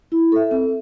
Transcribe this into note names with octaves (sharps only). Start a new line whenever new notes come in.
E4
A4 E5
C4